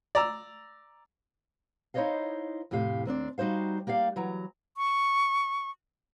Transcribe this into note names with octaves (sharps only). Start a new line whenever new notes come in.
D5 A#5 E6
D#4 E4 C5 C#5 D#5 F5
F2 A2 C3 G4 F5
D#2 C4 D4 D5
G3 D#4 F#4 C5 F5
A#3 G4 D5 F5
E3 F#3 A#5
C#6